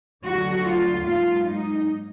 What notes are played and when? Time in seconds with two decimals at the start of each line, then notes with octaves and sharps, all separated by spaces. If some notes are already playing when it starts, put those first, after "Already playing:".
0.24 D2 D3 F#3 F#4
0.65 F4
1.05 G#2 F#3 A#3 F4
1.47 D#4